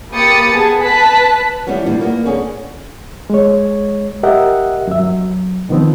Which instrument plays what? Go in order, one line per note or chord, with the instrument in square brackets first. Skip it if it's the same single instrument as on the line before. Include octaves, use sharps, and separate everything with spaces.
[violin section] A#3 G4 B5 D#6 A6 C#7
B3 G#4 A5
B4 A5 F#6 B6
[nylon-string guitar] E3 G3 B3 C#4 F4
A#2 G3 D4
A#3 B3
D3 C#4 G#4
[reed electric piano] G#3 C#5
G4 A#4 D#5 E5 F#5
F#2 E5
F#3
B2 D#3 F3 B3 C4